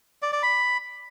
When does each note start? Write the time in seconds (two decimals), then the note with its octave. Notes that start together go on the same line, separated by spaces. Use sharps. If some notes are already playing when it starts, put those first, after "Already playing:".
0.22 D5
0.33 D5
0.43 B5